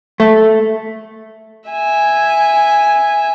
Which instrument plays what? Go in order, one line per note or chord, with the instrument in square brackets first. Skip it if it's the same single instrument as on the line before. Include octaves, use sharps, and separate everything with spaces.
[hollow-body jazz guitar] A3
[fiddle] E5 G#5